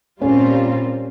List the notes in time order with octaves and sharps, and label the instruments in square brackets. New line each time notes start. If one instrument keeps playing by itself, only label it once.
[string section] A#2 G3 C4 F4 [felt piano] C#4